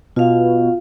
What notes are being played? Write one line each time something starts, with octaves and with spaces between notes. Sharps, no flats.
B2 F4 F5